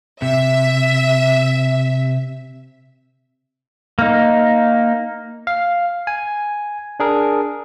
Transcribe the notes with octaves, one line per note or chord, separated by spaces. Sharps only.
C3 E5
A#3 D#4
F5
G#5
D4 G#4 A#4